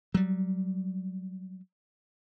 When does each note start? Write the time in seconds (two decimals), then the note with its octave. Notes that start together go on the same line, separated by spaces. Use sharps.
0.14 F#3 G3